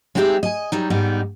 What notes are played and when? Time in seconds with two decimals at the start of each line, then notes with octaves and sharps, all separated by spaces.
0.15 G#3 C4 D#4 G4 G#4 E5
0.43 D#5 G#5
0.72 F#3 G3 D#4
0.90 G#2 G3 B3 D#4